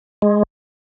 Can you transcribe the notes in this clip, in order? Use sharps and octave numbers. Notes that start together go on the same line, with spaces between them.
G#3